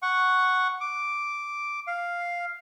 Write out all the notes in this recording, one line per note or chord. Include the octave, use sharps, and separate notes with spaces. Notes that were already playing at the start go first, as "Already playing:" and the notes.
F#5 C#6
D6
F5